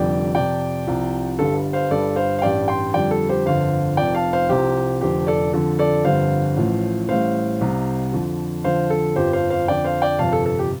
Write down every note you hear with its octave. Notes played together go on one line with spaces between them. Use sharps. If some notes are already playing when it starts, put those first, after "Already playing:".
Already playing: F1 F2 D3 G3 D5 G5
F2 C3 F3 D5 G5
C2 C3 F3
G1 G2 D3 G3 A4
C5 F5
G1 G2 G3 A4 D5
C5 F5
F5
A1 G2 G3 D5 G5
G5 C6
F2 D3 G3 D5 G5
A4
G4 C5
G1 F2 D3 C5 F5
F1 F2 F3 D5 G5
F5 A5
C5 F5
C2 C3 F3 G4 C5
F1 F2 D3 G4 C5
A4 D5
F2 D3 F3 A4
A4 D5
G1 F2 D3 G3 C5 F5
A1 A2 F3
A1 A2 G3 C5 F5
C2 C3 G3
F2 D3 F3
F2 D3 F3 C5 F5
A4
G1 F2 F3 G4 C5
C5 F5
C5 F5
F2 D3 F3 D5 G5
C5 F5
D5 G5
G1 F2 C3 F5 A5
A4
A4
G4